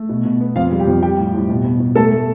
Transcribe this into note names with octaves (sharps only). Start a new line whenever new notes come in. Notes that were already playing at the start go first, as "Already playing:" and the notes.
Already playing: A3
B2
B2
B3
F2 F4 F5
G3
G4 G5
F2
G3 G4 G5
A2
A2
B2
B2
B2
A3 A4 A5
A3